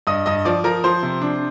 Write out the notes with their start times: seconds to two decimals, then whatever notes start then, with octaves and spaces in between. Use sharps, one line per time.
0.07 G2 D#5 D#6
0.26 G2 D#5 D#6
0.45 F3 D5 D6
0.64 F3 A#4 A#5
0.84 F3 C5 C6
1.03 C3
1.21 D4